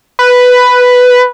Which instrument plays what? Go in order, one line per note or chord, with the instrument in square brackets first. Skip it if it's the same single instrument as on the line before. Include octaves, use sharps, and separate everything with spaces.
[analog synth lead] B4